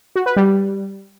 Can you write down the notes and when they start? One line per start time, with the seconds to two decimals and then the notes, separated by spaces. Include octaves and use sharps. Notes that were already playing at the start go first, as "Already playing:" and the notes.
0.16 F#4
0.26 B4
0.36 G3